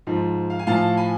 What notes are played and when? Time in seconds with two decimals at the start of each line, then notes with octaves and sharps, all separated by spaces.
0.07 G#2 F3
0.50 F5
0.59 G#5
0.67 A2 F3 F5 A5
0.97 G#5 B5